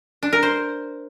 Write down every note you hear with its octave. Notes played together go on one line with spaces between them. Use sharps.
D4
A#4
C5